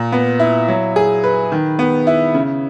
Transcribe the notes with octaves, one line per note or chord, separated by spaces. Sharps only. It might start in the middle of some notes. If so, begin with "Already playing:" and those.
Already playing: A#2
B3
E4
F#3
G#4
B4
D#3
B3
E4
C#3